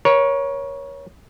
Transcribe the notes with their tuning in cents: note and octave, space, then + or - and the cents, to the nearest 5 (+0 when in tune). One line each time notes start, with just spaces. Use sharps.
A#4 +35 C#5 +0